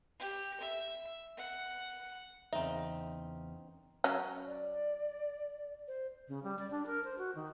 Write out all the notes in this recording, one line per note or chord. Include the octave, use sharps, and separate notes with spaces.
G4
E5
F#5
E2 C#3 C4 D#4 E5
F#3 C#4
D5
C5
C#3
G3
D5
D4
A#4
C5
F#4
D#3